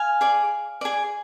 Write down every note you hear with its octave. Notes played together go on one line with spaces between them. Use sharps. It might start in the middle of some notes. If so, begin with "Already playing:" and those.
Already playing: F5 G#5
G#4 D5
G#4 D5